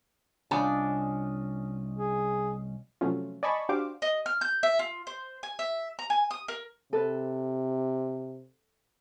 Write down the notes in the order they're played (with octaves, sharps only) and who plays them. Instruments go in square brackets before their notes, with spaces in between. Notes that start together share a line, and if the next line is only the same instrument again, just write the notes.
[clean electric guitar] C2 F#5 G#5 [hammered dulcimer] C#4 F4 D#5 [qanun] D4
[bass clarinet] G#4
[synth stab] C3 F3 F#3 A3 C#4 F4
D5 D#5 G#5 A5 B5 C#6
D4 F#4 G4 C5 F5 D6
[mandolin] D#5
F6
G6
E5
F4
C5
G#5
E5
A#5
G#5
D#6
A#4
[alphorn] C3 [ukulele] A4 B4